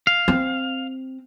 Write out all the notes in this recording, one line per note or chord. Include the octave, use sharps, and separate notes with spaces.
F5
C4